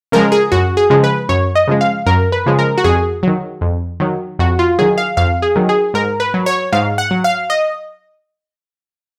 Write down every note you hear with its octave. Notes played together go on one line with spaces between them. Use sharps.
C#3 F3 G#3 A#4
G#4
F#2 F#4
G#4
C#3 F3 G#3
B4
F#2 C#5
D#5
C#3 F3 G#3
F5
F#2 A#4
B4
C#3 F3 G#3
A#4
F#4
F2 G#4
D#3 F#3
F2
D#3 F#3
F2 F#4
F4
D#3 F#3 G#4
F5
F2 F5
G#4
D#3 F#3
G#4
G#2 A#4
B4
F#3
C#5
G#2 F5
F#5
F#3
F5
D#5